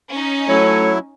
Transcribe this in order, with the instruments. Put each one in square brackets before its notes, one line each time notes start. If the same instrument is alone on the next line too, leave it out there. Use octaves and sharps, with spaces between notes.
[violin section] C#4 D#4
[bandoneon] F#3 E4 [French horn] A3 [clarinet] C#5